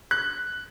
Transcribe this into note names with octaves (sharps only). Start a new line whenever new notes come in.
F#6